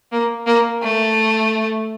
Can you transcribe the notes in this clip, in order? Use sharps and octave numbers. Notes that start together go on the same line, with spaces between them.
A#3
A#3
A3